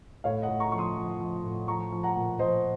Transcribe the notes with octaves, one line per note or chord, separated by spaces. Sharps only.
A2 C#5 F5
D#5 F#5
A2
A#5 C#6
F3 C#6
C6 D#6
F3
F3
A2
F3 A#5 C#6
F3
F#5 A#5
A#2
F3 C5 D#5